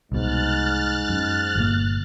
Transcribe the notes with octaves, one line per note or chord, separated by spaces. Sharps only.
C2 G#2 B2 F6 F#6 A6
F#2
G1 A#2 A#3